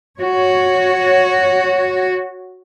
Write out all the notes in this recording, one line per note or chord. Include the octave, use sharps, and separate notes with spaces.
F#4 C#5